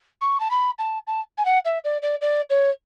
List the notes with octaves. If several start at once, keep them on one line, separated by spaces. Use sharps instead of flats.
C#6
A5
B5
A5
A5
G#5
F#5
E5
D5
D5
D5
C#5